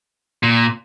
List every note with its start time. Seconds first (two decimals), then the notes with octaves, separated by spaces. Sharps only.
0.43 A#2